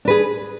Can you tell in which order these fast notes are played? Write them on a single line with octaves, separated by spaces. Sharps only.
D4 B4 G#4